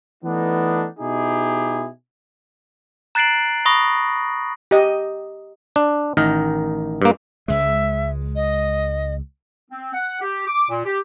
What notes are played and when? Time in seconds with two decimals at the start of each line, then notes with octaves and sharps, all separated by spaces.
0.23 E3 A3 B3 D4 D#4
0.99 B2 D#4 E4 G4 G#4
3.15 A#5 F#6 A6 C7 D7 F#7
3.66 B5 C#6 D#6 A#6
4.71 G4 D#5
5.76 D4
6.17 A1 D#3 D#4 A#4
7.02 G2 A#3
7.48 C#2 G#3 E5
8.36 D#5
9.71 C4
9.94 F#5
10.21 G4
10.47 D6
10.70 A#2
10.85 G4